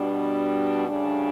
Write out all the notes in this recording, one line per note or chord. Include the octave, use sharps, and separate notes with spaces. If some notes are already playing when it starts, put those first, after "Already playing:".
Already playing: B2 G3 D4
D2 C#3 G3 D4